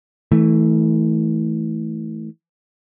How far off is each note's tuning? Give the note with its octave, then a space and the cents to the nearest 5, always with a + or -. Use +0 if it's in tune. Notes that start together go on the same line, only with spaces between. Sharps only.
E3 -25 A3 +0